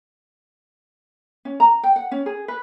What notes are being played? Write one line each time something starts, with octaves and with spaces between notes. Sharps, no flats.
C#4
A#5
G5
F#5
C#4
G#4
B4